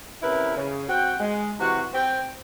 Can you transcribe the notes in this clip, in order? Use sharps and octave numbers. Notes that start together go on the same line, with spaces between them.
C3 C#4 E4 A#4 B4
C#3
C4 F#4 F#5 G5
G#3
C3 E3 F#4
C4 G5